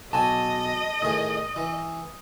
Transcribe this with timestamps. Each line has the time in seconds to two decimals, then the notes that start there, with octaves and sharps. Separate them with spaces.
0.13 B1 F#4 D#5 G#5 A5
1.02 A2 D#3 G#4 D#6
1.56 E3